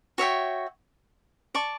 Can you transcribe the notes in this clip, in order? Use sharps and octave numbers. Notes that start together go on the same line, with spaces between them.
F#4 C#5 E5 G5
D5 A5 C#6